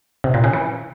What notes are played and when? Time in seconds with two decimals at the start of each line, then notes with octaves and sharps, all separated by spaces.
0.24 C3
0.34 A#2
0.44 C#3
0.53 E3